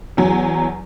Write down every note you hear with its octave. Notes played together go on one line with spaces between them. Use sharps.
E2 F#3